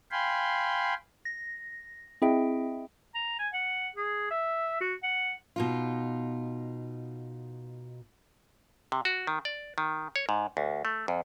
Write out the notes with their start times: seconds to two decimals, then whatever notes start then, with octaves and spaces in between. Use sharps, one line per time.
0.11 F5 G5 G#5 B5 C6
1.25 A#6
2.22 C4 E4 G#4 D#5 E5 G5
3.15 A#5
3.39 G#5
3.54 F#5
3.96 G#4
4.31 E5
4.81 F#4
5.03 F#5
5.56 B2 D#4 F4
8.92 C3
9.05 F#4
9.27 D#3
9.45 D5
9.78 D#3
10.16 C#5
10.29 G#2
10.57 D2
10.85 A3
11.08 F2